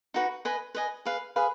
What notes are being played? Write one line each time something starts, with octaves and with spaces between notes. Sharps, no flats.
D#4 F#4 B4
B4 D#5 G#5
B4 D#5 G#5
G#4 B4 F5
G#4 B4 F5